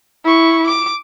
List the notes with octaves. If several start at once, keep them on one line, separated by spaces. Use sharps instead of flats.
E4 C#6
D6